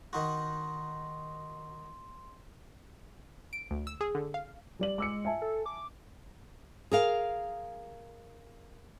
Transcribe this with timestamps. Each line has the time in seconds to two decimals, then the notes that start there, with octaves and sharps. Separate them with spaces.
0.13 D#3 D#4 F#4 C6
3.53 D7
3.71 D2
3.87 E6
4.01 G#4
4.15 D3
4.34 F5
4.80 G3 D5 F#7
4.98 G#3 D6 E6 C#7
5.25 E5 G#5 A5
5.42 A4
5.66 D6
6.91 G#4 A#4 F5